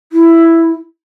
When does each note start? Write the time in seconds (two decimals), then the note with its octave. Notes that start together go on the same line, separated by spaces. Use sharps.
0.13 E4